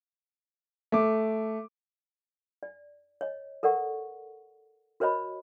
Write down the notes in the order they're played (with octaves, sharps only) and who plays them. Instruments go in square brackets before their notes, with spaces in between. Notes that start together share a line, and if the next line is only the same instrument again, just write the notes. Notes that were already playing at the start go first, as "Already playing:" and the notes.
[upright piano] A3 D6
[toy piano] D5
C#5 D#5
A4 A#4 D5 F#5 C#6
F#4 A#4 C5 C#5 D#5 B5